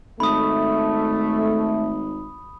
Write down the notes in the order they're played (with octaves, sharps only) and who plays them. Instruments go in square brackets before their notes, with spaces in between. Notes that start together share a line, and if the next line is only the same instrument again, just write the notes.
[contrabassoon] G#1 [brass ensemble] A3 [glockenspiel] B5 D#6